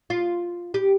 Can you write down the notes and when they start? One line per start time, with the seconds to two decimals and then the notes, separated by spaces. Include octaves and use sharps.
0.10 F4
0.74 G4